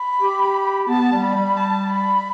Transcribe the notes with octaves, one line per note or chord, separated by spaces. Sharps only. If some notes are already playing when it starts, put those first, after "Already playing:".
Already playing: B5
G4
B3 A5
G3
B5
G3
A5
B5